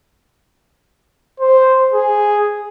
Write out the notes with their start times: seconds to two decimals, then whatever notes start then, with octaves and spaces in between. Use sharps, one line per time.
1.40 C5
1.94 G#4